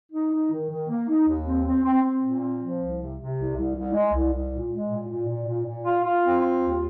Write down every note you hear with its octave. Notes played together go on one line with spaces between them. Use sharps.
D#4
D#4
D#3
D#3
A#3
D#4
D#2
C4
C4
C4
C4
A#2
C4
F3
C2
C3
C3
C2
C2
C2
G#3
C2
C2
A#2
G#3
A#2
A#2
A#2
A#2
A#2
F4
F4
C4
F4
D#2